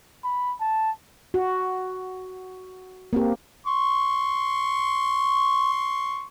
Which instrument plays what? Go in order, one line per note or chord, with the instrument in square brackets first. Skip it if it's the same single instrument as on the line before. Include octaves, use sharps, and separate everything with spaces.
[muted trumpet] B5
A5
[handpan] F#4
A#3 C4 G4
[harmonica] C6 C#6